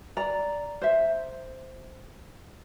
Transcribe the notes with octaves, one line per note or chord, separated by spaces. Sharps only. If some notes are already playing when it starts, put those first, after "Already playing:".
D5 A#5
C5 E5